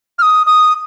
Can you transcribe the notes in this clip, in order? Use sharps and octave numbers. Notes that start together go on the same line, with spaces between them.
F6
D#6
D#6